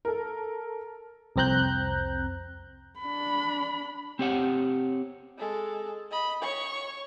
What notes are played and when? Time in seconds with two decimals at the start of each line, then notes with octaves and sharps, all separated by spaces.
0.05 A4 A#4
1.36 C2 F2 C4 A#5 F#6 G6
3.00 D4 B5
4.19 C4 G4 C#5 F#5
5.38 G#3 A4
6.11 D#5 B5
6.43 C#5 C#6